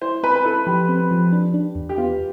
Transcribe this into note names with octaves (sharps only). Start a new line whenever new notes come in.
E4 C5
C4 B4
B4
E4 A4
F3 G4
C4
F3
D4
D4
E2
G4
B3 F4